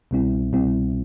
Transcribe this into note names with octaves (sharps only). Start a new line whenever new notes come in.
C2 B2 G3 C4 E4
C2 B2 G3 C4 E4